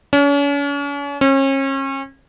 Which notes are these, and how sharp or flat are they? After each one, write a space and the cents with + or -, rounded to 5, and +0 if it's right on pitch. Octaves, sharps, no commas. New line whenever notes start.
C#4 +40
C#4 -35